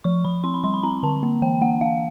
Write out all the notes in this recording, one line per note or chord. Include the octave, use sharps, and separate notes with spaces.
F3 C#6
F3 B5
C4 C6
B5
G3 C6
B5
C4 A#5
D3 A5
A#3
E3 G5
A#3 F#5
A#3 F5